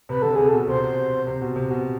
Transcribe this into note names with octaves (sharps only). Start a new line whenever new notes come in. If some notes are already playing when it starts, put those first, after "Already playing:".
C3 B4
D3 A4
C3 G#4
A4
B2
C3 C5
C3
B2
C3
B2